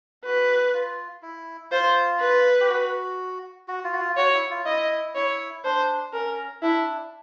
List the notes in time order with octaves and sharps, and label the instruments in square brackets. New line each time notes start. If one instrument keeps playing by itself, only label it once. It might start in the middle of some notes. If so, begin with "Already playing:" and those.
[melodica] F#4 [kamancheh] B4
[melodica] F4
E4
[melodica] F4 [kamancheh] C5
[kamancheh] B4
[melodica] G4
F#4
F#4
F4
F#4
F4
[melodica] F#4 [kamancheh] C#5
[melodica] E4
F4
[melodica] E4 [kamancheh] D#5
[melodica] E4 [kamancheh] C#5
[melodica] D4 [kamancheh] C5
[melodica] C#4 [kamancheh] A#4
[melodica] D4 [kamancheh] E4